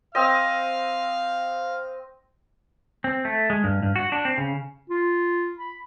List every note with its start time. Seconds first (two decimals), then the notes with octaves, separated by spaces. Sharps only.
0.15 C4 D#5 F5
3.04 C4
3.25 A3
3.50 G#3
3.64 G2
3.83 G2
3.96 F#4
4.12 D4
4.25 C4
4.38 C#3
4.90 F4
5.59 B5